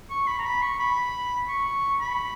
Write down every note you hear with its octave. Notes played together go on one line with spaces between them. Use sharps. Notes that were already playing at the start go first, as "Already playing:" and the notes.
C#6
B5
A#5
B5
C#6
B5
C#6
B5